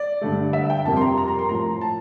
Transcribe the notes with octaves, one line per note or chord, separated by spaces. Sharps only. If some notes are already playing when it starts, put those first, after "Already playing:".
Already playing: D5
G2 D3 A3
E5
G5
F2 C3 G3 A#3 A5
C6
A#5
A#5
A#5
C6
A2 F3 A#3 A#5
A5